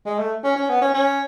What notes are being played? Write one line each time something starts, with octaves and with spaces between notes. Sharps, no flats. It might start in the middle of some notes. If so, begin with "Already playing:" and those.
G#3
A3
C#4
C#4
B3
C#4
C#4